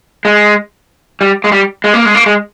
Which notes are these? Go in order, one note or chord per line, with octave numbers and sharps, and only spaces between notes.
G#3
G3
G#3
G3
G#3
A#3
G#3
A#3
G#3